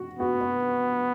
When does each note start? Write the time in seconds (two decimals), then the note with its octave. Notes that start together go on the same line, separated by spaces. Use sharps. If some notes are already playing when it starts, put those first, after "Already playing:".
Already playing: F#4
0.19 B3 F#4
0.41 B4